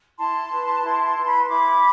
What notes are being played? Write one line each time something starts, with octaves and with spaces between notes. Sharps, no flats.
E4 A5 C6
B4
E4
B4
B5
C6
E4 B5 D6